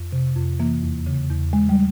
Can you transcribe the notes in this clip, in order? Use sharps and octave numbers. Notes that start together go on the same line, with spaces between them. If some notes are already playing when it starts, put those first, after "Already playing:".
Already playing: F2
C3
F2
E3 A#3
E2
C#3
E2
E3 G#3
G3